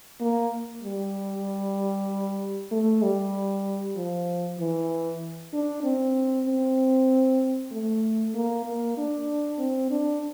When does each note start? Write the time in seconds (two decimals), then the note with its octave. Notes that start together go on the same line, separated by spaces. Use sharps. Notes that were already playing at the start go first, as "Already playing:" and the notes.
0.20 A#3
0.83 G3
2.71 A3
3.03 G3
3.96 F3
4.59 E3
5.53 D4
5.84 C4
6.47 C4
7.72 A3
8.34 A#3
8.66 A#3
8.97 D4
9.59 C4
9.91 D4